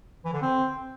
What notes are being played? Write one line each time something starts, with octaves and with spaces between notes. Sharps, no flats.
E3
D3
C4